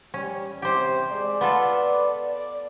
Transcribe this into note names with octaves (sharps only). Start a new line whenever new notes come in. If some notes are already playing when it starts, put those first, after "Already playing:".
G3 C#4
C3 G4 C5
G#3 D5
B3 F4 A4 B4
D5